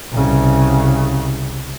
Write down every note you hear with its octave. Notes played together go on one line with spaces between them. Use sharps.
C2 C#3